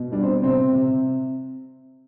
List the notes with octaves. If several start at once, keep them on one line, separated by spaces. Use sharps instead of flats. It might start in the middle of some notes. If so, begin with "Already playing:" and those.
Already playing: B2
G3 D4
C4
C3 C4
C3